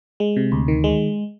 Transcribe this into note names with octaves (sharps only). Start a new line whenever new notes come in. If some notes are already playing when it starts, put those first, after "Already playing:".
G#3
C3
D2
D#3
G#3